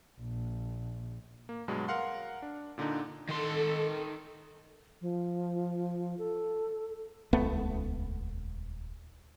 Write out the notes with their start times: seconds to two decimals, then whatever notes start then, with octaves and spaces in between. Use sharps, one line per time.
0.19 A#1
1.49 A#3
1.68 G2 B2 F#3 G#3
1.88 A#4 F5 F#5 C6
2.42 D4
2.78 A#2 D3 D4 D#4
3.29 D#3 A4 C6
5.01 F3
6.19 A4
7.33 D#1 C#2 A3 B3